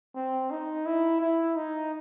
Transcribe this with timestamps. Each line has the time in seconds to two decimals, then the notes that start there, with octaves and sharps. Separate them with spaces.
0.15 C4
0.51 D#4
0.86 E4
1.21 E4
1.56 D#4